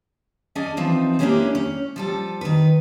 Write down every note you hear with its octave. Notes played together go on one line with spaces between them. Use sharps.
C#4 D4 G#4 D5 D#5
E3 F3 C4 D#4
G#3 A#3 C#4 D4 E4 G4
C#4
F3 G3 A4
D#3 B4